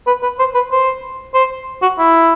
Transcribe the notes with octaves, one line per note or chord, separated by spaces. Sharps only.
B4
B4
C5
B4
C5
C5
F#4
E4